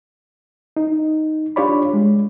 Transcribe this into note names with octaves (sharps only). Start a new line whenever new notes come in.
D#4
D4 F4 G4 C#5 D5 B5
G#3